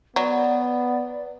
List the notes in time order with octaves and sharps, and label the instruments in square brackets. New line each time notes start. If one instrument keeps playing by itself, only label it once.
[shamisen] F#3 [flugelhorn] B3 [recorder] D5